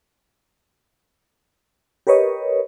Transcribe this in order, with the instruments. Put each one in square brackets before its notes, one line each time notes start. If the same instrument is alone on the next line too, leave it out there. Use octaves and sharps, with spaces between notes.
[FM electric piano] G4 A#4 B4 C#5 D#5